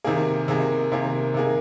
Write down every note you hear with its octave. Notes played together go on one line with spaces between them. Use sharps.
C3 D#3 A#3 G#4
C3 D#3 A#3 G#4
C3 D#3 A#3 G#4
C3 D#3 A#3 G#4